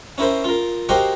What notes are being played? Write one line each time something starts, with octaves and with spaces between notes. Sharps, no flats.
C#4 E4 A#4 C5
F4 A#4
F#4 G4 A#4 C5 D#5 F5